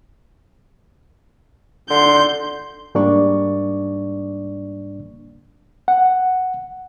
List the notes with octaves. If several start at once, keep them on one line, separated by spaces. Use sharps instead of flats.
D3 C6 G6
G#2 G3 A#3 D4 D5 C#6
F#5